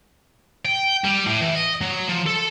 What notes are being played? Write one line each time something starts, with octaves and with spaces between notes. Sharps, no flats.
G5
G3
A2
E3
D#5
F#3
F3
A4